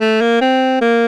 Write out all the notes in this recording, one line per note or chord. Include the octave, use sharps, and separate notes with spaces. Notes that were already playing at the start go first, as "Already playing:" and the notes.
A3
A#3
C4
A#3